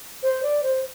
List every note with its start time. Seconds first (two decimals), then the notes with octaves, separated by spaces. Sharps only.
0.23 C5
0.43 D5
0.63 C5